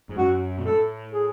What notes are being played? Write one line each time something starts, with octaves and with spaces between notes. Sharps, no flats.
G#2
F#2 F#4
B2
A2 A4
G#4